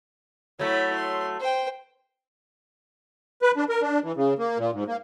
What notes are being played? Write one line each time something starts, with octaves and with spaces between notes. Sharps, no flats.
F#3 A3 E4 B5
C6
C5 G5
B4
D4
A#4
D4
E3
C#3
A#3
A#2
G#2
A#3